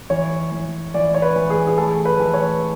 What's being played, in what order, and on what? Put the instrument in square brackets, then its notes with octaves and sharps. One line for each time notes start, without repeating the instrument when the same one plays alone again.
[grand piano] E3 C#5
E3
E3 D5
C#5
B4
E3
G#4
G#4
A3 A4
B4
E3
C#5